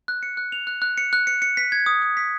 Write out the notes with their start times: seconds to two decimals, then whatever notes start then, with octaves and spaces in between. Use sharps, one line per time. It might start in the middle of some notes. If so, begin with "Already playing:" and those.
0.08 F#6
0.23 C#7
0.37 F#6
0.52 F7
0.67 F#6
0.82 F#6
0.98 C#7
1.13 F#6
1.27 C#7
1.42 C#7
1.57 B6
1.72 G#6
1.86 D#6
2.02 D#6
2.17 B6